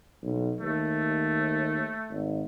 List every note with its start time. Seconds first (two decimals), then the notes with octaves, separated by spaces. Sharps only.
0.23 B1
0.61 D#2 A3
2.10 G#1